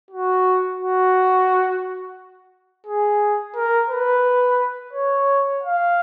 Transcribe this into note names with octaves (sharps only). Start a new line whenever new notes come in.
F#4
F#4
G#4
A#4
B4
C#5
F5